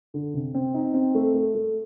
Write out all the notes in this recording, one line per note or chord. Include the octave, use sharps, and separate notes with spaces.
D3
C3
C4
D#4
C4
A3
A3
A3